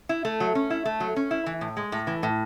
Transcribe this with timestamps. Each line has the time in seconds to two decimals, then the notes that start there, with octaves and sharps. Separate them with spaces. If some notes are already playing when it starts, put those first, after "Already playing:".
0.09 E4
0.25 A3
0.40 F#3
0.55 C#4
0.70 E4
0.85 A3
1.00 F#3
1.16 C#4
1.31 E4
1.46 E3
1.61 A2
1.77 G#3
1.92 A2
2.07 E3
2.23 A2